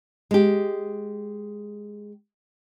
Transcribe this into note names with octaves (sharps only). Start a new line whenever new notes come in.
G#3 G4